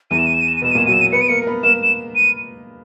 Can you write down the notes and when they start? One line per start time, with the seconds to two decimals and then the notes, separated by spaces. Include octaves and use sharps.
0.11 E2 E3 D#7
0.18 E7
0.26 D#7
0.34 E7
0.41 D#7
0.48 E7
0.56 D#7
0.62 B2 B3 E7
0.71 D#7
0.75 A#2 A#3 E7
0.86 F#3 F#4 D#7
0.93 E7
1.01 D#7
1.12 B3 B4 C#7
1.21 D#7
1.28 A#3 A#4 C#7
1.42 A#4
1.47 B3 B4
1.63 A#3 A#4 E7
1.83 E7
2.15 D#7